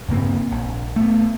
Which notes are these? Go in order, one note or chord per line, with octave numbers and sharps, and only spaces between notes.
G2 C#3 A#3 C4
A#1
A3 B3